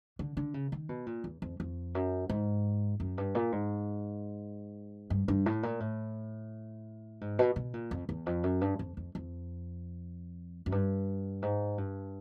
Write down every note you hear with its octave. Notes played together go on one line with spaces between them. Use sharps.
D3
D3
C#3
D#3
B2
A#2
E2
F2
F2
F#2
G#2
F#2
G2
A#2
G#2
G2
G2
A2
A#2
A2
G#2
B2
B2
A#2
F2
E2
F2
F#2
G2
F2
F2
F2
F#2
G2
G#2
G2